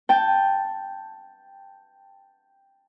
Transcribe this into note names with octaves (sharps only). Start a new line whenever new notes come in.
G5 A5